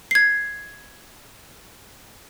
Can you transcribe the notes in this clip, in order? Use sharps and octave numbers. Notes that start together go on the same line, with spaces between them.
G#6 C7